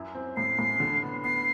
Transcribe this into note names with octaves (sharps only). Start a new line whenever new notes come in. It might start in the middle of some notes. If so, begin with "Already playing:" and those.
Already playing: F#2 E4
C4
A2 C7
A2
D3
B3
B3 C7